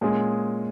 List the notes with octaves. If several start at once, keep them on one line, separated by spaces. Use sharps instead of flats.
A#2 G#3 C#4 G#4